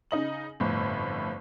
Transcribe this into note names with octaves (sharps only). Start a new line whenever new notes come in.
C#3 D#4 D#5 F#7
G1 F2 A2